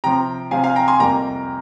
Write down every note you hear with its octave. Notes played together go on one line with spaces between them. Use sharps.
C3 F3 C4 G5 A#5
C3 F3 C4 F5 G#5
F5 G#5
G5 A#5
G#5 C6
F2 C3 G3 A#3 G5 A#5